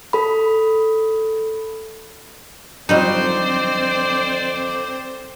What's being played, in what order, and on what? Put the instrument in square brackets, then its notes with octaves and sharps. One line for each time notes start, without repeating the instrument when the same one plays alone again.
[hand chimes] A4 B5
[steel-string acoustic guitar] F2 D3 [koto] F#3 G3 D#4 [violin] C4 C5 [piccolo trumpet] D5